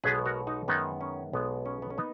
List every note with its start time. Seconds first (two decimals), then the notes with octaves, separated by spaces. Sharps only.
0.04 B1 B2 G#3 B3 G#4 B4
0.25 F#4 A#4
0.47 D#4 F#4
0.68 F#2 D#3 G#3 B3 D#4
1.01 C#4
1.33 B1 B2 G#3 B3
1.66 C#4
1.82 B3
1.90 C#4
1.98 A#3 B3 D#4